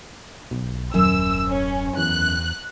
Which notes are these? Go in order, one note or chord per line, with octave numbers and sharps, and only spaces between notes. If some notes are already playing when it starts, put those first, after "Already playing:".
B1
D#1 F#2 E6
C#4
E2 F#6